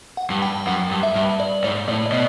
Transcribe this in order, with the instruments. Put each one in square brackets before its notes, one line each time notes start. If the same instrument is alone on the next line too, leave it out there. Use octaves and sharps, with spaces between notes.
[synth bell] F#5
[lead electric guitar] G2
[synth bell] G5
[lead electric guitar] F#2 [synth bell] F#5
[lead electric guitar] G2
[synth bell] E5
[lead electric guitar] G2
[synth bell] D5
[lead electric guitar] G#2 [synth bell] C#5
[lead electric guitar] A2 [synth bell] D5
[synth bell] D5
[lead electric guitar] B2 [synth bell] D#5